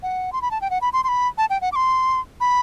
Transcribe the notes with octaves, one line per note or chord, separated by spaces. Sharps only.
F#5
C6
B5
A5
G5
F#5
B5
C6
C6
B5
A5
G5
F#5
D6
C6
B5